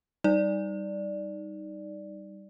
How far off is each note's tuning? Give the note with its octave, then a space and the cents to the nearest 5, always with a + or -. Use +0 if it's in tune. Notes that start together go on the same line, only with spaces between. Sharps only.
G3 +0 D#4 +0 D5 +0